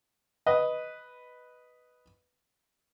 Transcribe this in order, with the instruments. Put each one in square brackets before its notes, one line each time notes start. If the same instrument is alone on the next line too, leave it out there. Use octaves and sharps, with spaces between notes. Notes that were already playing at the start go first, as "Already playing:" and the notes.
[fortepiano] B4 D#5